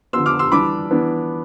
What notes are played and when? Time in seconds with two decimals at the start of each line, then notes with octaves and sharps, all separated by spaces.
0.13 D3 F3 B3 C6 E6
0.26 D6 F6
0.39 C6 E6
0.52 E3 G3 D4 B5 D6
0.91 E3 B3 D4